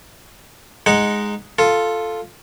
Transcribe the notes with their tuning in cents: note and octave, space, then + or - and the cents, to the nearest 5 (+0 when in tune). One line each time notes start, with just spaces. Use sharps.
G#3 +0 D#4 +0 F#5 -10
F4 +0 A4 +0